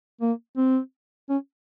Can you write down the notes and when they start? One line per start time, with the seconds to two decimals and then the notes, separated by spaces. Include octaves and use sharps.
0.21 A#3
0.57 C4
1.30 C#4